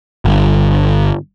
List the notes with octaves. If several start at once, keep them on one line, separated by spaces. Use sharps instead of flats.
G1